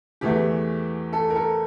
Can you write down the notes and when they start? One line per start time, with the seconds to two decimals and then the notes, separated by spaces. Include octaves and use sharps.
0.21 E2 E3 A3 G4
1.13 A4
1.30 A#4
1.35 A4